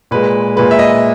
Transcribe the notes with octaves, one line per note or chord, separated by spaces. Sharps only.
A#2 G#3 B4
A#2 G#3 B4
E5
D#5